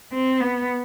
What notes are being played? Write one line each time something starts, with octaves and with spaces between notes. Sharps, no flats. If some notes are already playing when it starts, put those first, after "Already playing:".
C4
B3